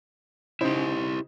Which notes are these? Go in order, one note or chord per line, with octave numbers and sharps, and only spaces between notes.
C#3 D#4 E4 G4 C5